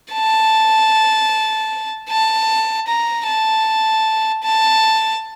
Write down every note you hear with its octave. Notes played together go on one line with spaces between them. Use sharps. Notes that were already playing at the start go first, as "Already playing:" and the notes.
A5
A5
A#5
A5
A5